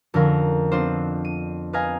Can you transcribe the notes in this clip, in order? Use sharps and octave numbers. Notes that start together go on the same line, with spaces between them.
F2 D3 C#4 A#4 F5
B3 C4 D4 F4 C5
D#7
B4 D#5 F5 G#5 A#5 F6